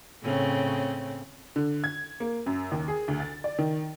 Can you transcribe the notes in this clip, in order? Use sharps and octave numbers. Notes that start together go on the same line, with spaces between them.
A2 C#3 C4
D3
G#6
A#3
F#2
D#2
G#4
D2
A6
D5
D#3